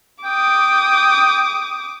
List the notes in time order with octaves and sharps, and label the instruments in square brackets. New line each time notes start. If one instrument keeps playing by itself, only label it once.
[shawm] G5 [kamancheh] D6 D#6